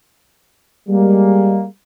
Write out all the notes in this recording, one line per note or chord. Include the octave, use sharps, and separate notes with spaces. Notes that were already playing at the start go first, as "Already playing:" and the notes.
G3 G#3 A#3